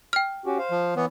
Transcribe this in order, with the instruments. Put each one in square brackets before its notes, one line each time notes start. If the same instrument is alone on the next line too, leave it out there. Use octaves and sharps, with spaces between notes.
[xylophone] G5 F6
[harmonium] C#4 F#4 G4
C5 F5
[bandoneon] F3
[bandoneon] E3 B3 [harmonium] E4 C#5